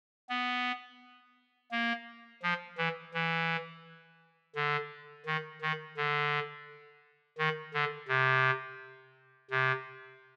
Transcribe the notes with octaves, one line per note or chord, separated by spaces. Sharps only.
B3
A#3
F3
E3
E3
D3
D#3
D#3
D3
D#3
D3
C3
C3